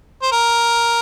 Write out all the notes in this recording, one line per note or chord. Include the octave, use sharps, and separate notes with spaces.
C5
A#4